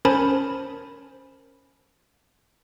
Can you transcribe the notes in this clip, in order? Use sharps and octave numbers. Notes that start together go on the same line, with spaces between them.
C#4 A#4 C5 G#5 A5 B5